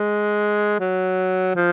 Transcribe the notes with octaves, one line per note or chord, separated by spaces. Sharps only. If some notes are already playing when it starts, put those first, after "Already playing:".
Already playing: G#3
F#3
F3